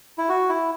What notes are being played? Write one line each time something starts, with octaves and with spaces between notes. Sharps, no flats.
E4
F#4
E4